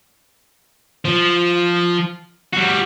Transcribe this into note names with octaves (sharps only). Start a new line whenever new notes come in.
F3
G3 F#4